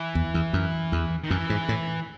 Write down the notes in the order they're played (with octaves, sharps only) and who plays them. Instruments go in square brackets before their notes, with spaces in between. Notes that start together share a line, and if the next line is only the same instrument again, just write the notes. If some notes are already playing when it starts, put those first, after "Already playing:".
Already playing: [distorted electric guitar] E3
[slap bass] E2
E2
F#2
E2
[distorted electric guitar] D#3
[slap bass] F#2 [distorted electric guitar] E3
[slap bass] G#2
A2